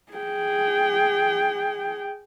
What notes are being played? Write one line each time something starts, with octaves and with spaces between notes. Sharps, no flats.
G#4 G5